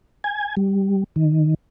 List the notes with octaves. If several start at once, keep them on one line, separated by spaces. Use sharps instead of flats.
G#5
G3
D#3